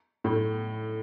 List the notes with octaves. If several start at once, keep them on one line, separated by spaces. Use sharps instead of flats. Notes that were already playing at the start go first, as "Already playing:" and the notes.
A2